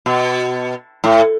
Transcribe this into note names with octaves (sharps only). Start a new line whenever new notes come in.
B2
A2